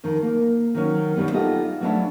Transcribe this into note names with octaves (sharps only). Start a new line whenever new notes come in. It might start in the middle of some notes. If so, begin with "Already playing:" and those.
F2 D#3
A#3
D#3 F#3 C#4
B2 D#3 G3 B3
B3 D#4 F4 G4 A4 D#5
F#3 A3 B3 C#4 D4 E4